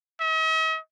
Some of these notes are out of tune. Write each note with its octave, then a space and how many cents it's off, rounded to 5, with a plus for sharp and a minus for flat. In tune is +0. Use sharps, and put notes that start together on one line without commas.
D#5 +45